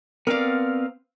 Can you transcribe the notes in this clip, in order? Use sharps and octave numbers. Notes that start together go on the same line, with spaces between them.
B3 C4 A#4 D5 F5